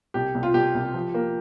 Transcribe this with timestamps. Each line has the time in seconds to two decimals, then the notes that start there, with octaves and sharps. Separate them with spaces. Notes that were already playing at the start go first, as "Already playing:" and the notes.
0.14 C2 G4
0.35 C2
0.43 F4
0.54 C2 G4
0.75 C2
0.94 F3
1.14 A#3